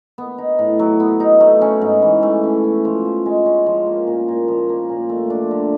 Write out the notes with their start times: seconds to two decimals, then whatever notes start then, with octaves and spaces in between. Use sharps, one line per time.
0.18 B3
0.38 D#4
0.59 A2
0.79 F#3
1.00 B3
1.20 D#4
1.40 A3
1.61 C#4
1.81 G#2
2.02 E3
2.23 A3
2.43 C#4
2.64 C#4
2.85 F3
3.05 F3
3.26 G#3
3.46 C#4
3.66 F3
3.86 A#3
4.07 A#2
4.28 A#2
4.48 F3
4.69 A#3
4.89 A#2
5.09 A3
5.30 D4
5.51 D3